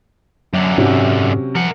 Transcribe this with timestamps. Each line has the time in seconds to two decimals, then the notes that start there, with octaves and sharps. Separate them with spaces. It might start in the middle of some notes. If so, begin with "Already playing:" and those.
0.54 F#2 D3 F#3
0.78 G#2 C3 F#3 C#4
1.55 F3 A#4 F#5